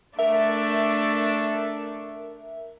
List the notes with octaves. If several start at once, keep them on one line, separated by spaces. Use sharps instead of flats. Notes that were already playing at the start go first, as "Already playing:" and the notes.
A3 D4 A#4 E5